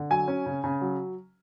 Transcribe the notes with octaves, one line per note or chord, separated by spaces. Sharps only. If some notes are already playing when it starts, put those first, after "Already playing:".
Already playing: D3
F#3 G#5
C#4
C#3
C#3
F#3